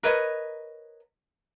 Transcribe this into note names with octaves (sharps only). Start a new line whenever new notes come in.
A#4 B4 C#5 D#5